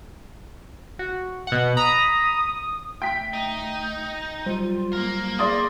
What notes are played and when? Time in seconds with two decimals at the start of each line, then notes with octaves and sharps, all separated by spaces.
0.99 F#4
1.47 B2 F#5
1.77 A#5 B5 D#6
3.02 A3 G5 B6
3.33 D#4
4.46 F#3 G3 F4 C5
4.93 A#3 A#4
5.39 G#4 D5 C6 D#6